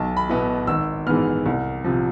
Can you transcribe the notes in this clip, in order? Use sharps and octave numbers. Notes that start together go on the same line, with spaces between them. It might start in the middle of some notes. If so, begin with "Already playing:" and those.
Already playing: B1 A5
B5
B2 B3 E4
G#1 E6
G#2 E3 B3 F6
C2
C3 F3